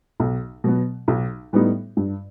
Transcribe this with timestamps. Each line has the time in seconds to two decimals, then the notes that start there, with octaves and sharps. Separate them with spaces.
0.20 B1
0.64 B2 F#3 B3
1.08 B1
1.53 A2 G3 B3 D#4
1.97 G2